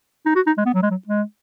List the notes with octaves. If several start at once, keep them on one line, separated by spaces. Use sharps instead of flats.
D#4
F#4
D#4
G#3
B3
F#3
G#3
F#3
G#3